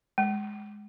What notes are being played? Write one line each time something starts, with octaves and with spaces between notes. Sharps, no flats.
G#3